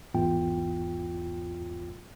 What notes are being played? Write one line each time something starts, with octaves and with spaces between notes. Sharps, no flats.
A1 E2 G#2 F4 G5